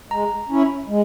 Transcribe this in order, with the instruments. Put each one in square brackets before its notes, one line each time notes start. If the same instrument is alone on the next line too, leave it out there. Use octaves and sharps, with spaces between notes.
[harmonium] G#3 [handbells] A#5
[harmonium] C#4 E4
G#3